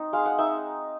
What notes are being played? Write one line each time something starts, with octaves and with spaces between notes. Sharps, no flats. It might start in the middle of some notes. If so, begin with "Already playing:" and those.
Already playing: C4 D#4
G#3 F5
F#5
D#4 E5